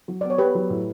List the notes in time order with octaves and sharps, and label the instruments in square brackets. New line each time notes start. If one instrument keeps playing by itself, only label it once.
[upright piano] F#3
[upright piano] B3 [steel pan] D5
[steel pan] C#5
[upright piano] B3 [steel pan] G4 B4
[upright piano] F#3
A2